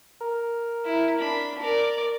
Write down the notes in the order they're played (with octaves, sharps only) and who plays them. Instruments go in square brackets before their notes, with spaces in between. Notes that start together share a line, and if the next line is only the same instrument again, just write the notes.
[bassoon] A#4
[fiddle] E4
D4 B5
A#4 D5